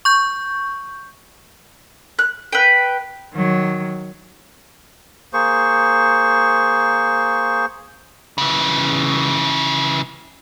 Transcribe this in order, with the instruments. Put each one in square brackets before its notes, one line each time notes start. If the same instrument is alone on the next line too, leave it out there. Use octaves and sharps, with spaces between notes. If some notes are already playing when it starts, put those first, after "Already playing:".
[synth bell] C#6 G6
[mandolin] F#6
B4 G5
[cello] D#3 F#3
[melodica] A#3 G#4 C5 C#6
[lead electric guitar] C#3 E3